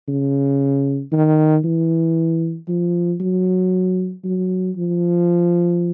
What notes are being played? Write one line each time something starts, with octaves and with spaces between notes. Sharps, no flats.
C#3
D#3
E3
F3
F#3
F#3
F3